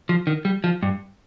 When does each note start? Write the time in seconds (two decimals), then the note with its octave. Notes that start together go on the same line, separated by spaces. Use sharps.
0.09 F3
0.27 D#3
0.45 G3
0.64 F3
0.83 G2